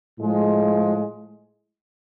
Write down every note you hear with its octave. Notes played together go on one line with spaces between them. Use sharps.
A2 F3 G#3